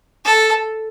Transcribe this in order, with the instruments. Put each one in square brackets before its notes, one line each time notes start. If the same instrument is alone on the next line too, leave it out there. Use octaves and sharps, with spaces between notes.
[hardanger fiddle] A4